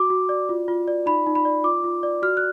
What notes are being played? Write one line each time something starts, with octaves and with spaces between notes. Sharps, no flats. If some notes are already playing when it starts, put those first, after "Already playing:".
Already playing: F#4 D6
F#4
D5
F4
F4
D5
D#4 B5
D#4
B5
D5
F4 D6
F4
D5
F#4 F6
F#6